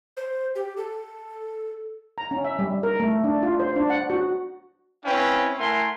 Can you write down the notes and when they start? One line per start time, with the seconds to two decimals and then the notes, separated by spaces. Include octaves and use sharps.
0.17 C5
0.55 G4
0.77 A4
2.18 A#5
2.31 C#4
2.44 E5
2.59 G3
2.83 A#4
3.00 A3
3.24 D4
3.43 F4
3.60 C5
3.76 D4
3.90 F#5
4.10 F#4
5.05 C4 C#4 E4 B4 F5 G5
5.58 A3 E4 A#4 F#5 G#5 C6